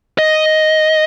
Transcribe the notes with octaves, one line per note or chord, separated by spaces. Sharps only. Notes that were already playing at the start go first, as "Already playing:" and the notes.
D#5